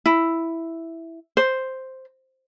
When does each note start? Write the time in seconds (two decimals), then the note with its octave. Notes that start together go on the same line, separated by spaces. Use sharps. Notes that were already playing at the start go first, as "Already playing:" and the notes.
0.06 E4
1.37 C5